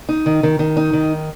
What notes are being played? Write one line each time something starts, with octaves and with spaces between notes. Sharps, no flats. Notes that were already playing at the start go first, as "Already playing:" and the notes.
D#4
D#3
D#3
D#3
D#4
D#3